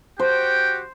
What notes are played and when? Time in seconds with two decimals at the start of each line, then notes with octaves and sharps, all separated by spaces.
0.19 F#4 G4 C5 G5